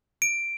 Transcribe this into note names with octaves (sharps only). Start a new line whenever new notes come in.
D7